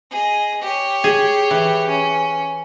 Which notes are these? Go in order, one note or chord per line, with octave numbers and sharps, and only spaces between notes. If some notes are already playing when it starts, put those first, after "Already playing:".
G#4 D#5
G4 C#5
G#4
E3
C#4